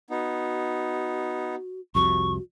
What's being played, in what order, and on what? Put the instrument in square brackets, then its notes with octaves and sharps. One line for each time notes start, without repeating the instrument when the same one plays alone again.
[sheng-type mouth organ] B3 D#4 [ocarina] F#4
[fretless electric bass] C2 F2 C3 [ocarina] F#4 [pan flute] C#6